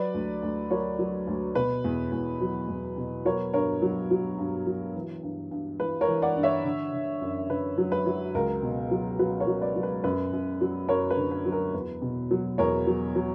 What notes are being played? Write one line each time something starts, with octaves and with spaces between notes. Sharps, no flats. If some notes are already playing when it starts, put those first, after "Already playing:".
Already playing: F#3 B4 D5
D2
D2
F#3 A#4 C#5
F#3
D2
B2 B4
E2
E2
F#3
E2
B2
F#3 A#4 C#5
G2 A#4 C#5
F#3
F#3
G2
F#3
E3
G2
G2
E3 B4
A#4 C#5
E3
D5 F#5
G2
C#5 E5
D3
D3
F#2
D3 B4
F#3
B4
F#3
C#2 A#4
B2
F#3
F#3 B4
A#4 C#5
F#3
B4 D5
F#3
B4
F#2 B4
F#2
F#3
F#2 A#4 C#5
B4
D3
B4
F#3
A#4
E2 B4
B2
F#3
E2 A#4 C#5
F#3
F#3